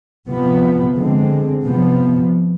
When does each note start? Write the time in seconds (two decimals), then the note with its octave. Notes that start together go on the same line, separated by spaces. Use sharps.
0.29 C3 F3 B3
0.95 D3 G#3 C4
1.63 C3 F3 B3